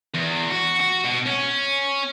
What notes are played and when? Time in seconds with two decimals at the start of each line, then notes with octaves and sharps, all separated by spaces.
0.14 E2
0.50 F#4
0.80 F#4
1.04 B2
1.26 C#4